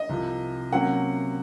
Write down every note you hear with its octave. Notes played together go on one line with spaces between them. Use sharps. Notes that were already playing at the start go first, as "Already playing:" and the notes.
Already playing: D#5
C2 C3 F3
C3 F#3 A#3 C#4 F#5